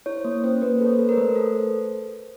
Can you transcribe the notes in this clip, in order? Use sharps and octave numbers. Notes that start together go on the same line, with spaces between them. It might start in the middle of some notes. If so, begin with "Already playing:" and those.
E4 C#5
C5
A#3
C#4 C5
A#3 B4
A4 B4
C#5
C5
A4 B4
A#4 B4
A3 C5
A4